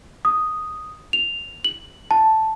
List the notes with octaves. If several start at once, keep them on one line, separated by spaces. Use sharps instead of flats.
D#6
F7
F#7
A5